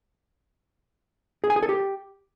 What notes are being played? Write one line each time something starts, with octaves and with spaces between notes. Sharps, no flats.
G#4
G#5
G#4
A4
G4